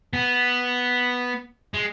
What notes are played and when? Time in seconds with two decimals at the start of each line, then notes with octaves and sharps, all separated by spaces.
0.13 B3
1.74 G#3